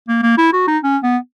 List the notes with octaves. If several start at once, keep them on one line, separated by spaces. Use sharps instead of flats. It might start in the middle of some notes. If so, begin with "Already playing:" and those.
A#3
A#3
E4
F#4
D#4
C#4
B3